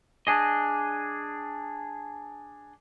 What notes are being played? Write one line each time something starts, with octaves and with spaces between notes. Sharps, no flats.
D4 G#4 D#5